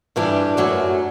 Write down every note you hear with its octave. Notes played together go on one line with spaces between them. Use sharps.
G2 E3 G3 D4 G4
F#2 F#3 A3